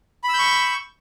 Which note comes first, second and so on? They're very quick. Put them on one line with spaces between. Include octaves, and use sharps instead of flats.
B5 E6 G6 C#6